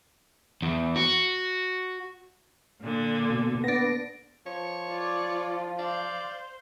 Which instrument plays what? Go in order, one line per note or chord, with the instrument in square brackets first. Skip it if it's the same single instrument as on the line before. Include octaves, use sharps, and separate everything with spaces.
[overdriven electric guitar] E2
F#4
[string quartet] A#2 D3
[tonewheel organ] B2
[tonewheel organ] B3 [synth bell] D4 A#6
[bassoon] F3 [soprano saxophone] C#5
[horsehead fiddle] F4 [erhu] D5
[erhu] C5 [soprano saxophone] D5 [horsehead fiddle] F5